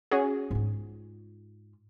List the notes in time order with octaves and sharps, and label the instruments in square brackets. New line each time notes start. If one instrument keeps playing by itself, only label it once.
[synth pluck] C#4 F#4 G#4
[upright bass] G#2 F4